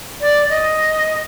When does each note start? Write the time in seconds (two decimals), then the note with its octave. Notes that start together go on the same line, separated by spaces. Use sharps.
0.21 D5
0.50 D#5